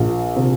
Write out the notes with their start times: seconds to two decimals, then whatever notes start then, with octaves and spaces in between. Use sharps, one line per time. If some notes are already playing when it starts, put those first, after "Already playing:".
Already playing: A#1
0.36 C3